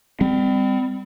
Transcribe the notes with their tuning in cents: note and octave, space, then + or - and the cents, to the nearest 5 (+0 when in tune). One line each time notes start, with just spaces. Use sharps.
G3 +30 C4 -25